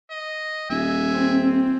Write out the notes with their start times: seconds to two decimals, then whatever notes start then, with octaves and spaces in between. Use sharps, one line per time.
0.11 D#5
0.70 D#1 E5 G#5
1.11 C4